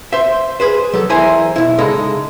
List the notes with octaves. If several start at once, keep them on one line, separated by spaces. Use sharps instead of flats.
C5 E5
G#4 B4 C5
F#3 A4
E2 E4 A#4 C5 G#5 A#5
B1 E4
C#3 G#3 D#4 A4